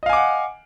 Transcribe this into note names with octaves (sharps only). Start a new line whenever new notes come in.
D#5 F5 F#5 G#5 D6